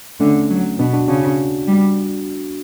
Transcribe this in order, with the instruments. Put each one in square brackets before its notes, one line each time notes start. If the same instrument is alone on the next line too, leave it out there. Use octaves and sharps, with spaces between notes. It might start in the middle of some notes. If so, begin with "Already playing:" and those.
[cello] D3 [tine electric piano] A3 C#4
[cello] F#3
[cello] B2 [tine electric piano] B3 D4
[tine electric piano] D4 F#4
[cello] C#3 [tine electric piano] D4 F#4
[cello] G3